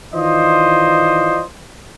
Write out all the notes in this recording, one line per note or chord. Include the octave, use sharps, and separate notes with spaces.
D#3 E3 F4 C5 D5 D#5